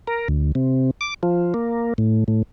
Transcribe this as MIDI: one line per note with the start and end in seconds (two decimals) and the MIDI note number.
0.07 0.28 70
0.28 0.52 38
0.55 0.91 48
1.01 1.14 86
1.23 1.54 53
1.54 1.94 58
1.98 2.24 45
2.28 2.43 45